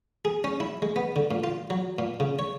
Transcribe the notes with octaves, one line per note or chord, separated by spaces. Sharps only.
G#4
C#4
E4
G#3
B3
D3
A#2
F4
F#3
A#2
C#3
C#5